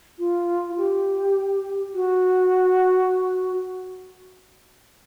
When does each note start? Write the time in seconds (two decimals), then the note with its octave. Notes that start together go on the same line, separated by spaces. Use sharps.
0.18 F4
0.77 G4
1.94 F#4